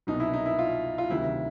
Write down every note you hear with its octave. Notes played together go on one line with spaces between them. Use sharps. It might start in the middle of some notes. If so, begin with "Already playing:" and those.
C2 B2 F#3 D#4
E4
D#4
E4
F4
F4
D2 C3 D#3 F#3 E4